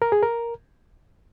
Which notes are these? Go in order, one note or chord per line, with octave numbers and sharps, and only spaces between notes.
A#4
G#4
A#4